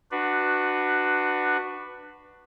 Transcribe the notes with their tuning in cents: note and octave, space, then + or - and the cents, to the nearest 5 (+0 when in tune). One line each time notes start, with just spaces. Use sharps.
D4 +25 F#4 +0 B4 +0